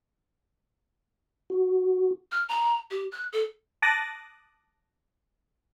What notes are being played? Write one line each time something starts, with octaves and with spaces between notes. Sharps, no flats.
F#4
F6
A#5
G4
F#6
A4
A5 D6 D#6 F#6 A6 A#6